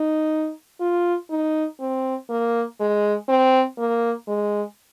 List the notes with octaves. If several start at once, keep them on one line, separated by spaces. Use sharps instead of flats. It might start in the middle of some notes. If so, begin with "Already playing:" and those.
Already playing: D#4
F4
D#4
C4
A#3
G#3
C4
A#3
G#3